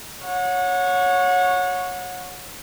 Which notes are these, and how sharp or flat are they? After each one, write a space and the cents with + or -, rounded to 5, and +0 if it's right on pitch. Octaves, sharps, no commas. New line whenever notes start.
C#5 +0 F#5 -30